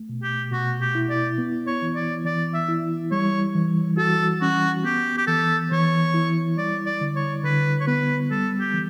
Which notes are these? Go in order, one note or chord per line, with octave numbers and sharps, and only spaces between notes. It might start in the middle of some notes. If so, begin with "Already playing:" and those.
Already playing: A3
B2
G4
B2 F#4
G4
E4
D5
B3
C#5
E3
D5
E3 D5
E5
E4
G3 C#5
E3
F#4 A4
C#4 F#4
B3 G4
G4
E3 A4
E3 C#5
E4
G3 D5
D5
D3
C#5
D3 B4
C#5
B3 B4
G3 A4
G4
E3